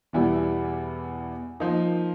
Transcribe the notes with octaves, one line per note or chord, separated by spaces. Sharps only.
E2 B2 G3 B3 E4
F3 A#3 D#4